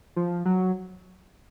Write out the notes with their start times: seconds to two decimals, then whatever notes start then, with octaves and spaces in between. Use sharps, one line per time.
0.16 F3
0.45 F#3